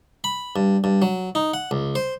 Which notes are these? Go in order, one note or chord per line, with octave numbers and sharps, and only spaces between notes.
B5
G2
G2
F#3
D#4
F#5
C#2
C5